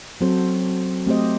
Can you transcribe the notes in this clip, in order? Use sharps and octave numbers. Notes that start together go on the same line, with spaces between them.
F#3 C4 F#4 A4 C5
A3 C4 G4 C5 D#5